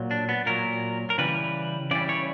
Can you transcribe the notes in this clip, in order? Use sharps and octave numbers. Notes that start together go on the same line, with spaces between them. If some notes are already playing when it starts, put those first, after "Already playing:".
Already playing: A#2 F#3
D4
B3
A#2 F#3 A#4
A#4
C#3 E3 G3 B4
C#3 E3 G3 D5
C#5